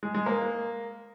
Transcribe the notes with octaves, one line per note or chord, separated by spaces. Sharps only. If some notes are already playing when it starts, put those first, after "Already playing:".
G#3
G#3
A#3